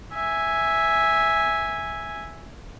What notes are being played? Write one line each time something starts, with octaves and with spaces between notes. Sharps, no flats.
E5 G#5